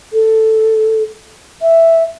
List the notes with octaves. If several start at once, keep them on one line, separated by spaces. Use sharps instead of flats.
A4
E5